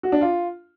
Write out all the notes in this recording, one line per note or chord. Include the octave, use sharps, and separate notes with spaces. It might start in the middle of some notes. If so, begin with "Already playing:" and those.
F#4
D4
F4